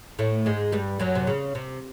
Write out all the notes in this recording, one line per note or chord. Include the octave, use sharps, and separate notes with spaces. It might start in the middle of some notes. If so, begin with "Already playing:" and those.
A2 A3
G#2 G#3
G2 G3
F#2 F#3
C3
C#3
C3